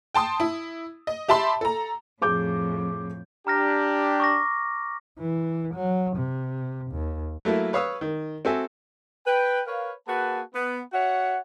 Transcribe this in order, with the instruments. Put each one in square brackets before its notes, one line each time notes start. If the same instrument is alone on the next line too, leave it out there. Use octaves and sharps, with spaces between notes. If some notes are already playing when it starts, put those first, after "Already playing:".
[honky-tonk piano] G5 A5 C6 D#6
E4
D#5
G4 E5 A5 B5 C6
A4 A#5
[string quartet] F2 A2 [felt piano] G#4 D6 G6
[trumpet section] D4 G4 [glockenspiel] A#5 F6 A#6
[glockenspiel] C#6 D6 A#6
[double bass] E3
F#3
C3
D#2
[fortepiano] F#3 A3 A#3 E4
B4 C#5 F5 D#6 E6
D#3
C4 F#4 A4 E5 G#5
[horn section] B4 G5
A#4 B4 C#5 F5
A#3 F#4 G#4 B4 F#5 A5
B3
F#4 C#5 E5 F#5